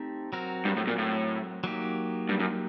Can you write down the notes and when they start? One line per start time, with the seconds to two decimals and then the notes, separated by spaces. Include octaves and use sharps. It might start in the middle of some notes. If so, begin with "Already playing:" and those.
Already playing: A3 C4 D#4 G4
0.33 F#3 C4 F#4 A#4
0.65 G2
0.77 A2
0.87 A#2
0.98 A2
1.64 F#3 A#3 D#4 G4
2.29 G2
2.40 F#2